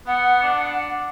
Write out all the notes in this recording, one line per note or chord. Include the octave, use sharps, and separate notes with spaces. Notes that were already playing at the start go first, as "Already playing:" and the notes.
B3 F#5
D4